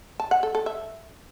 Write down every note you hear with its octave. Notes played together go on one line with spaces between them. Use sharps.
A5
F#5
A4
A4
E5